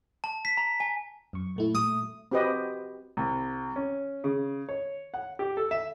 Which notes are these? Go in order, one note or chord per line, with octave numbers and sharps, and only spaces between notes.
A5
B6
A#5
G#5
F#2 C#6
A#2 A3 E4
D#6
C4 F#4 G4 B4 D#5
C2
C#4
C#3
C#5
F#5
G4
A4
E5